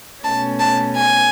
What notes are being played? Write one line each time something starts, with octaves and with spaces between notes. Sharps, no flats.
B2 A3 C#4 A5
A5
G#5